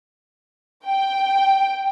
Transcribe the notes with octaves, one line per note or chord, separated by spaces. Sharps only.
G5